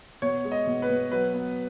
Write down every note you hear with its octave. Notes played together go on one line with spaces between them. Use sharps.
B2 C#5
G#3
D#5
B2
B4
B2
F#3 B4
B3